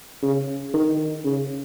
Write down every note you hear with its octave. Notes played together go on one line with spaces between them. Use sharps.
C#3
D#3
C#3